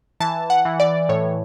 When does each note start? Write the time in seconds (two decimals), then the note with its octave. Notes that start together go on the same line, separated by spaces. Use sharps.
0.20 E3 A5
0.50 F#5
0.65 E3
0.80 D5
1.09 A2 C#5